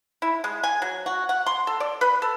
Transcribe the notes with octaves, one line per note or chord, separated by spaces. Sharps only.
E4
G#3
G#5
F#3
F#4
F#5
C6
A4
D5
B4
A4